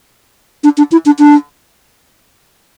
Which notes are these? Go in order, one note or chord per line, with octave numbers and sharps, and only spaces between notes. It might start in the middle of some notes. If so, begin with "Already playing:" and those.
D4
D4
E4
D4
D4